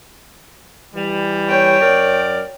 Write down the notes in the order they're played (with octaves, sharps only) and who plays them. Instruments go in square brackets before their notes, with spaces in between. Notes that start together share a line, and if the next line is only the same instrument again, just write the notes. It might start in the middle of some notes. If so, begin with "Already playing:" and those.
[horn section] E3 G3
[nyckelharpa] C#5 G5
[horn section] F#2 A#4 D5